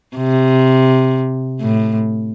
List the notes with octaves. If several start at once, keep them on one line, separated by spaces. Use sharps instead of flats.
C3
A2